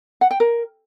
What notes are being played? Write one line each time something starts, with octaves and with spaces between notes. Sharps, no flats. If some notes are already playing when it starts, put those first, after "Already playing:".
F#5
G5
A#4